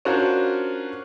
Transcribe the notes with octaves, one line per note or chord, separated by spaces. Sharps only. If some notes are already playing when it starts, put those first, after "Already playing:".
C#4 D4 F4 F#4 A#4 C5